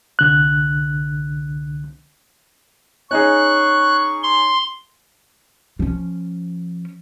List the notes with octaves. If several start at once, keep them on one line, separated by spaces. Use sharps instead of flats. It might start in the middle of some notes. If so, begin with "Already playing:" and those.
C2 D3 F#6
C#4 D#4 G#4 C#6 F#6
C6
F3 C#4